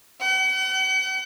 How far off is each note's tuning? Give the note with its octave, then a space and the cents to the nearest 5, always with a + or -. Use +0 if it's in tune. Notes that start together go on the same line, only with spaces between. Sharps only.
F#5 +45